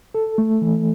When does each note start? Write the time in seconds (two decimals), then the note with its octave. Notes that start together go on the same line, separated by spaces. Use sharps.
0.15 A4
0.38 A3
0.62 E3